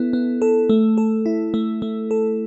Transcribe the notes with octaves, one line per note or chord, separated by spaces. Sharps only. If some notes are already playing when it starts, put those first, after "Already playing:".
Already playing: B3 E4 A4
B3
A4
A3
A4
E4
A3
A3
A4